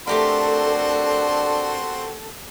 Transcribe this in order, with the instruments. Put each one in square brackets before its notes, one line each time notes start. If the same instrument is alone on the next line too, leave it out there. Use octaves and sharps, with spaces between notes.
[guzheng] A3 G4 A#4 [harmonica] C4 F#4 C6 [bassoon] D4 [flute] A4